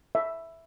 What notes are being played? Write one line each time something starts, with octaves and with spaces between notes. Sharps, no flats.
E5